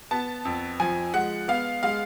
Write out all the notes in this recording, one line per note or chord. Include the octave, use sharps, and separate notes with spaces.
B3 A5
F2
F3 G#5
G#3 F#5
B3 F5
G#3 F5